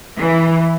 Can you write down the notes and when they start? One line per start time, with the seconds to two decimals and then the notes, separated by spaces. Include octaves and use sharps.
0.19 E3